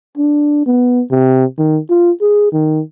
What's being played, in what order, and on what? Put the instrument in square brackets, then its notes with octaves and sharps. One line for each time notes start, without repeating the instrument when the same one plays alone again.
[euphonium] D4
B3
C3
D#3
F4
G#4
D#3